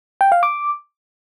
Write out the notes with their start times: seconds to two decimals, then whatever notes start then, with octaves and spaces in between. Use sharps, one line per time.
0.21 G5
0.32 F5
0.43 D6